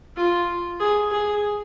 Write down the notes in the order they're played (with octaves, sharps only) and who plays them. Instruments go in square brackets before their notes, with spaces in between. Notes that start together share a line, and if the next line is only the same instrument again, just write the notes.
[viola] F4
G#4
G#4